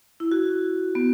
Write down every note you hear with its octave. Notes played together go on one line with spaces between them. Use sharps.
E4
F#4
B3